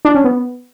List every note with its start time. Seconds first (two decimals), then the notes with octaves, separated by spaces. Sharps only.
0.05 D4
0.15 C#4
0.24 B3